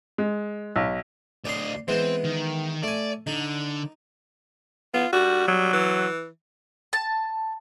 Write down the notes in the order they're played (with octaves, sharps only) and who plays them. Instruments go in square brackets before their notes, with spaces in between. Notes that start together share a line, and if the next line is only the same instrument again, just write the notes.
[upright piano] G#3
B1
[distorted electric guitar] D2 D#5 [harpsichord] D5 C6
[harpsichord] E3 G#3 B3 [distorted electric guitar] C4
[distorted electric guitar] D#3
[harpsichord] A3 G#5 [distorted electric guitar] D5
[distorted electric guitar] D3 [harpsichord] D#4
[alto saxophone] B3 [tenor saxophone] F4
[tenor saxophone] G3 [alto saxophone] F#4
[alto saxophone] F#3
[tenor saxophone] E3
[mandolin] A5